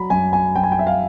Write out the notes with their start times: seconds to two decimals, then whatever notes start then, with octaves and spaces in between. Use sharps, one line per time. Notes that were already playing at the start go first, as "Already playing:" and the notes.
Already playing: F#3 A#5 B5
0.10 F#2 G#5
0.33 G#5
0.56 F#2 G5
0.63 G#5
0.72 G5
0.79 E5
0.87 F5